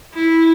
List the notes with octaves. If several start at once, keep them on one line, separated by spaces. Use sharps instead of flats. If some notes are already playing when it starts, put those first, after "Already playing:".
E4